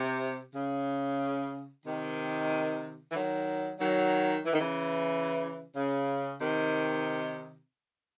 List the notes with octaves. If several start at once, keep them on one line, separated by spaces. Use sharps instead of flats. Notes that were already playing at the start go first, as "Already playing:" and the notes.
Already playing: C3
C#3
C3 D#3
E3
D#3 F#3
D#3 F#3
E3
D#3
C#3 E3
C#3
C3 D#3